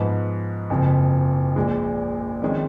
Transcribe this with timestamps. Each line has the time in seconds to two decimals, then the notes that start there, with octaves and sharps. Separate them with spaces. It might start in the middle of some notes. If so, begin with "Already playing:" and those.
Already playing: G#2 F3 B3
0.70 F#1 F2 F3
1.56 A#1 A#2 G#3
2.42 F2 D#3 G#3 C#4